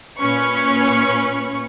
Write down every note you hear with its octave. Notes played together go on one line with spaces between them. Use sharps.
A#2 C#4 B4 C#6